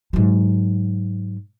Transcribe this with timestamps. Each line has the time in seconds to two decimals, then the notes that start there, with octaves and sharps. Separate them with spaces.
0.13 G#2 F#3